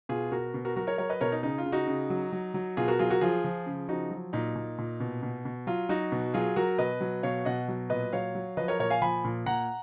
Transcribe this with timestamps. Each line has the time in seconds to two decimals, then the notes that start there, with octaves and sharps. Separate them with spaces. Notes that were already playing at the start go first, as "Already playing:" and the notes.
0.09 B2 F4 G#4
0.32 B2 F#4 A#4
0.54 B2
0.65 F#4 A#4
0.76 F#3 F#4 A#4
0.87 A#4 C#5
0.98 F#3 A#4 C#5
1.09 B4 D#5
1.21 B2 A#4 C#5
1.32 D#4
1.43 C#3 D#4
1.58 F4
1.66 C#3
1.72 D#4 F#4
1.87 C#3
2.10 F#3
2.32 F#3
2.54 F#3
2.77 B2 F4 G#4
2.88 F#4 A#4
2.99 F#3 F4 G#4
3.10 F#4 A#4
3.21 F3 F4 G#4
3.45 F3
3.66 C#3
3.89 F3 D#4 F#4
4.11 F#3
4.33 A#2 D#4
4.56 A#2
4.78 A#2
5.00 B2
5.23 B2
5.45 B2
5.67 F#3 F4
5.89 F#3 D#4 F#4
6.12 B2
6.34 F#3 F4 G#4
6.56 F#3 F#4 A#4
6.78 B2 B4 D#5
7.01 F#3
7.23 B2 C#5 F5
7.45 B2 D#5 F#5
7.68 F#3
7.90 A#2 B4 D#5
8.13 F#3 C#5 F5
8.35 F#3
8.57 F3 B4 D#5
8.68 A#4 C#5
8.79 A#2 A#4 C#5
8.90 F5 G#5
9.02 F3 G#5 B5
9.24 A#2
9.46 A#2 F#5 A#5